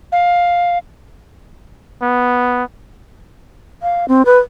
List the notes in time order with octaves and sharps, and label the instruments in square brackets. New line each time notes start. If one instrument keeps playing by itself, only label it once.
[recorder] F5
[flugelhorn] B3
[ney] F5
C4
B4